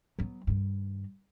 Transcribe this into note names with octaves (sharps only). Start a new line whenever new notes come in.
F#3 B3
G2 D#3